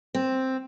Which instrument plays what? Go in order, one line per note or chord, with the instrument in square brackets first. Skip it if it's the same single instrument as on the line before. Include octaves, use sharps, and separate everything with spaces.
[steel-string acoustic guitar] C4